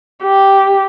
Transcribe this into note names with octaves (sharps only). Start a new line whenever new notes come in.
G4